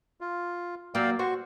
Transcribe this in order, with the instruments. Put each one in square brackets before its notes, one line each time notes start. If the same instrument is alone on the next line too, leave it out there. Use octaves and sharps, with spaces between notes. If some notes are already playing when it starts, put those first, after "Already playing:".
[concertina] F4
[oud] F#3 A#3 [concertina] D5 F5 G5
[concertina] F#4 C#6 [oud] C5